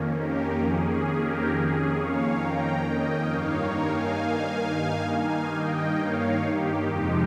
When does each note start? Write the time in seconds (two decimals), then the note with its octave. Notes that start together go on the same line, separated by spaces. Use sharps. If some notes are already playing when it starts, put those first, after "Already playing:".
Already playing: F2 D#3 A#3 C#4
0.15 G4 A#4
0.60 G#4
0.90 G#4
1.20 G4 A#4
1.50 G#4
1.95 C#5 F5
2.40 G5 A#5
2.85 D#5 G5
3.29 G2 D#3 A#3 D#4 C#5 F5
3.60 A#4 C#5
3.90 F5 G#5
5.10 F5 G#5
5.55 D#5 G5
6.00 C#5 F5
6.45 G4
6.90 F2 C3 F3 G#3 D#4